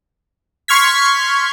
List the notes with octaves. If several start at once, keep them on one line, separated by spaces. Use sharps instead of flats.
C6 C#6 F6 G#6 B6